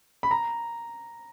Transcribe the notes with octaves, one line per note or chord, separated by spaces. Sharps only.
B5
A#5